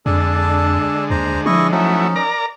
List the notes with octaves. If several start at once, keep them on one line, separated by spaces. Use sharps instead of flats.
F2 D3 G#3 D4 A4 A5
D#2 C5 A#5
F3 E4 D#5 C#6
F#3 A3 C#4 D#4 E4
A#4 D5 A#5